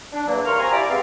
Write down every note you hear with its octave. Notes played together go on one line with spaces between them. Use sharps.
D4
E2 F#3 A#3
D#2 A#4 F5 C6 C#6 F6
C4 G#5 A#5
E4 F4 G4 D5
G#3 B3 C4 G4 F5